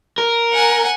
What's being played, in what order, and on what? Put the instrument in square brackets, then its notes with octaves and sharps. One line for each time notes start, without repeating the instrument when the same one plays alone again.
[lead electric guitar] A#4
[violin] F#5 G#5